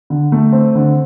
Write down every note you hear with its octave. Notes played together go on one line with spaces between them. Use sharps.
D3
A3
C4
D3